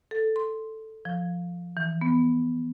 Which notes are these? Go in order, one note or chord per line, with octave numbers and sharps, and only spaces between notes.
A4
C6
F3
E3
B3